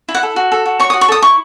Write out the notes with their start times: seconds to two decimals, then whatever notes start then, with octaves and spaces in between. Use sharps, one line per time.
0.09 E4
0.15 F#5
0.23 A4
0.36 F#4
0.52 A4
0.66 F#4
0.79 C#5 C#6
0.90 D#6
0.94 F#4
1.01 C#6
1.08 A4 D#6
1.22 E4 C#6